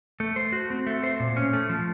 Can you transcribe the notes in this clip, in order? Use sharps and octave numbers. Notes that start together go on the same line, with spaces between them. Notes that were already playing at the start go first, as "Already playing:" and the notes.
A3
C5
F#4
C4
A3
C5
A#2
C#4
A3
F3